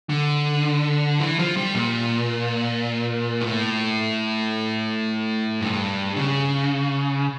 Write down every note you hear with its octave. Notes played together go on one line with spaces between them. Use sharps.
D3
E3
F3
G3
A#2
A2
G2
C#3